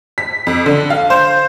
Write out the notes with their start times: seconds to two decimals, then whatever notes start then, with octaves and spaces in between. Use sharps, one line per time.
0.18 B6
0.47 F2
0.66 D3
0.90 F5
1.10 C5